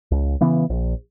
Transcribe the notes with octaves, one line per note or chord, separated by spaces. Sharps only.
C#2
C#3 E3 B3
A#1